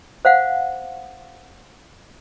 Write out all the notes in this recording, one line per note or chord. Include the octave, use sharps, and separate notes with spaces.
C5 F5 F#5